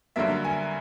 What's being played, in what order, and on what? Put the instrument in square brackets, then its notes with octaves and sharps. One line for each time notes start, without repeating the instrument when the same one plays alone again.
[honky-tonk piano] G2 D3 F#3 A#3 E5
G#5